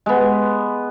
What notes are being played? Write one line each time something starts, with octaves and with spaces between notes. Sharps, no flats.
G#3 B3